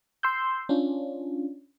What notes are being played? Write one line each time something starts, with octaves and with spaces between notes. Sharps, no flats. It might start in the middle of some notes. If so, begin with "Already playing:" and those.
C6 E6 G6
C#4 D4 F4